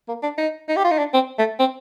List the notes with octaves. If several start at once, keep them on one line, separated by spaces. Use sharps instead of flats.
A#3
D4
D#4
D#4
G4
F4
D#4
D4
C4
A3
C4